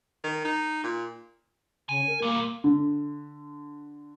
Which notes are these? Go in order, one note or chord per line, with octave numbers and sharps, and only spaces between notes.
D#3
D#4
A#2
C#3 G#5
A#4
A#2 G3 A#3
D3